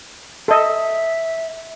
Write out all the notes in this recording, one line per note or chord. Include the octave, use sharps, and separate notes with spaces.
A4 D#5 E5